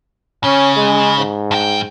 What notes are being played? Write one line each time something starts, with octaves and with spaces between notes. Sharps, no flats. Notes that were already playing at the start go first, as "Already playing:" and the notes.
C#3 C#4
G#3
G#2
G2 G5